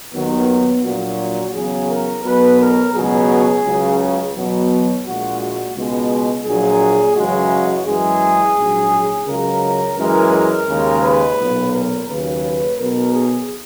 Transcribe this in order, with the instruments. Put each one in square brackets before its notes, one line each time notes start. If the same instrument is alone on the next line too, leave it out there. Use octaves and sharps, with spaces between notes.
[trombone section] D#2 D#3 F#3 B3
A#1 A#2 F#3 F#4
E2 C#3 F#3 G#4
A#4
B1 B2 F#3 B4
A#4
C#2 B2 F#3 G#4
C#2 C#3 F#3
E2 B2 F#3
A#1 A#2 G#3 F#4
F#4
C#2 B2 G#3
A#1 A#2 F#3 G#4
F#2 C#3 E3 G#3 F#4
F#2 E3 G#3 G#4
A#1 G#2 F#3
C#2 C#3 F#3 A#4
F#2 E3 G#3 A#4
A#4
D#2 C#3 G#3
B4
B1 A#2 F#3
A#4
D#2 C#3 F#3 B4
B1 B2 F#3 A#4
G#4